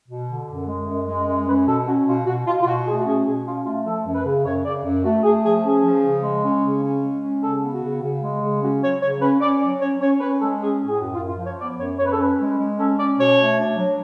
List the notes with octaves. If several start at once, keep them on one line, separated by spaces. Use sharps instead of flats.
B2
D3
F#2
G#3
F#2
G#3
F#2
C#4 B4
B2 A4
C#4 F#4
B2 F4
B2 F#4
B2 F4
F4
B2 F#4
A3 G#4
F#4
C#4 G#4
B2 G#4
C#4 F4
A3 F4
F3 A4
F#2
B4
C#3
F#2 C#5
C#3 D5
F#2
A3 F#4
A3 G#4
F3 G#4
C#4 G#4
F3
C#3
G#3
C#4
C#3
C#4
G#3
C#4
C#3 A4
B3
F#4
C#3
C#3
G#3
C#3
C#4 F#4
F#3 C#5
C#3 C#5
C#4 B4
C#4 D5
F#3 D5
C#4 C#5
C#4 C#5
C#4 B4
G#3 A4
C#4 G#4
A2
G#4
F#2 F#4
F4
F#2
F4
F3
C#5
B3 D5
F#2 C#5
F#2 C#5
B4
A4
C#4 B4
G#3
G#3
C#4 A4
C#4 D5
B2 C#5
A3
D4
F#3